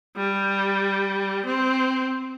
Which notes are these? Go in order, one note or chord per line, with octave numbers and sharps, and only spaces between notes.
G3
C4